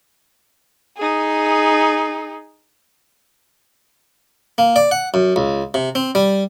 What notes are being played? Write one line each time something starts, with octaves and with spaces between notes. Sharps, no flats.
D#4 G#4
A#3
D5
F#5
F#2
C#2
C3
C4
G3